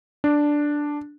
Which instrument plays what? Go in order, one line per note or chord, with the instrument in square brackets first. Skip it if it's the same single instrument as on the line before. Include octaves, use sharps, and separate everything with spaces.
[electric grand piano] D4